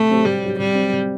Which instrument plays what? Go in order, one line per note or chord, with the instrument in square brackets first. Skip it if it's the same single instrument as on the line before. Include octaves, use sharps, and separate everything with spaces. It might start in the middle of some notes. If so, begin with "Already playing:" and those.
Already playing: [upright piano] C3 [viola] A3
[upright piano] F#3 C4 G4
[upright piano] C3 [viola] G3
[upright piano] F#3 C4 G4
[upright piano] C3 [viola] G3
[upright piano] F#3 C4
C3